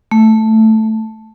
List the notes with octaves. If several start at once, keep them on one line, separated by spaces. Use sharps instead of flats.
A3